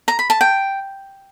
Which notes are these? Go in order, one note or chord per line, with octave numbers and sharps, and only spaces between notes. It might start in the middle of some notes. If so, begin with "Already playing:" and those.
A#5
B5
A5
G5